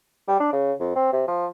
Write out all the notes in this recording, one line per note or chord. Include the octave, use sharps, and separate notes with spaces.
G3
D4
C#3
F2
C4
C3
F3